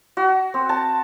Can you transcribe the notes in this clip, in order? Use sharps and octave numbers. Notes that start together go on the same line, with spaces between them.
F#4
C4
A5